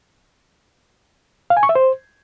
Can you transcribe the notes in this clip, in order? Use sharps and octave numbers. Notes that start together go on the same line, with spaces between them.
F5
G#5
C#6
E5
C5